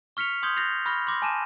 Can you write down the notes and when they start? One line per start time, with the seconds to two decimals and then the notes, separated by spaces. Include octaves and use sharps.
0.17 C#6 F6 B6 C#7 F7
0.43 C6 D#6 G6 G#6 G7
0.56 F#6 G6 A6 A#6 C7 F7
0.86 B5 C#6 F6 F#6 A#6
1.07 C6 D6 A#6
1.22 G#5 A5 D6 D#7 E7